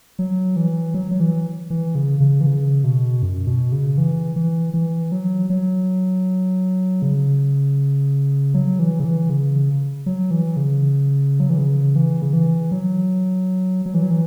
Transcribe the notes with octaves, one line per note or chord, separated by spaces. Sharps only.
F#3
E3
F#3
F#3
E3
E3
C#3
C#3
E3
C#3
B2
F#2
B2
C#3
E3
E3
E3
F#3
F#3
C#3
F#3
E3
C#3
E3
C#3
F#3
E3
C#3
F#3
E3
C#3
E3
C#3
E3
F#3
F#3
E3
F#3
E3